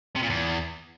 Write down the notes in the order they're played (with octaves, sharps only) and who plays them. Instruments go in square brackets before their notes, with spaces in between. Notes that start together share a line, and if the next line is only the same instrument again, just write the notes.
[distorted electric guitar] C3
A#2
E2